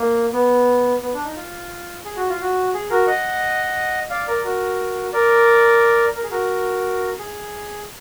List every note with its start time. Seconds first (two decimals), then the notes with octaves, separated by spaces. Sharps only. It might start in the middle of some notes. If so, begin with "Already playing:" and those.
Already playing: A#3
0.33 B3
1.02 B3
1.14 D4
1.24 D#4
1.36 F4
2.05 G#4
2.16 F#4
2.29 F4
2.41 F#4
2.74 G#4
2.90 F#4 A#4
3.07 D#5 F#5
4.10 D5 F5
4.27 A#4 D5
4.44 F#4 A#4
5.13 A#4 D5
6.15 A#4
6.23 G#4
6.30 F#4 A#4
7.18 G#4